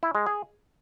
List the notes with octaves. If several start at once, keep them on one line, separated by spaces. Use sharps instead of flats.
E4
G#3
G#4